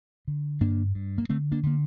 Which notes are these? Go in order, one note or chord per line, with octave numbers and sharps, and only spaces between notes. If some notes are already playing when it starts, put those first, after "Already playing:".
D3
G2 A#3 D4
G2
A#3
D3 A3 C4
A#3 D4
D3 A#3